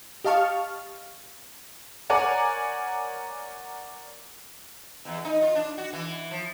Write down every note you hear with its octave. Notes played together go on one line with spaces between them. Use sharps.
G4 D#5 F5 A5 C#6 F6
A#4 C#5 D5 F#5 G#5 A#5
E2
D#4
F4
D4
F#4
E3
F3